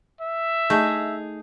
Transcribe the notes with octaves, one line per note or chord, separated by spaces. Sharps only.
E5
A3 D#4 G#4